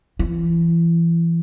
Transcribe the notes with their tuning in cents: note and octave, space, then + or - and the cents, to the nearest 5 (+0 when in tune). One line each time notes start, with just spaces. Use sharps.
E3 +25 E4 +45